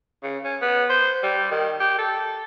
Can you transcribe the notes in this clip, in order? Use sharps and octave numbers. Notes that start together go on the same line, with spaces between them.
C#3
C#4
B3
C5
G3
D#3
G4
A4